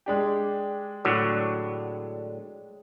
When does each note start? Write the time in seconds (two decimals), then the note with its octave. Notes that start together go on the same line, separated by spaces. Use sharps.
0.06 G#3 D4 G4
1.05 A2 D3 F#3